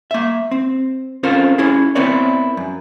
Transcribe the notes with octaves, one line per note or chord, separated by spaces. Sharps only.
A#3 E5
C4
C4 C#4 F4 A4 A#4 C5
C#4 E4 G#4
B3 C4 E4 A#4 C#5 D5
F#2